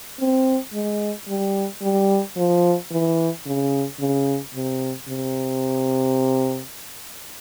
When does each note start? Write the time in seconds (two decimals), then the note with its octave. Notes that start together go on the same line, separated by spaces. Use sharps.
0.20 C4
0.74 G#3
1.28 G3
1.82 G3
2.37 F3
2.91 E3
3.46 C#3
4.00 C#3
4.55 C3
5.08 C3